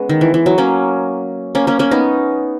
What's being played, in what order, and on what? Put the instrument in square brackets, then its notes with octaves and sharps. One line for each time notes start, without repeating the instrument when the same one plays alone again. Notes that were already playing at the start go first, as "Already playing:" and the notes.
Already playing: [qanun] G#3 B3 C#4
D#3
E3
E3
F#3
A#3 C#4
A#3 C#4
A#3 C#4
A#3 C#4
B3 D#4